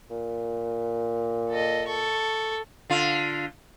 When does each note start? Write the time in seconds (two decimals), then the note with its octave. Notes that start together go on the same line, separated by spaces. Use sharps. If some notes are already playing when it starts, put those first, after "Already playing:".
0.10 A#2
1.50 A4 D#5
1.87 A4 C#6
2.90 D3 F4